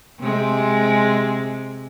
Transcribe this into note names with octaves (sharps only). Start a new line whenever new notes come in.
C3 G#3